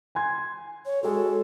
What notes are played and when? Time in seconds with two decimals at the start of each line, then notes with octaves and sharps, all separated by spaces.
0.15 G#5 C6 G#6
0.86 C#5
1.03 G#3 F#4 A4